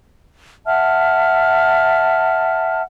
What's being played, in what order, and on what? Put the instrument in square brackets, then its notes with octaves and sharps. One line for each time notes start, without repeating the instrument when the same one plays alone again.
[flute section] E5 F#5 A5 F6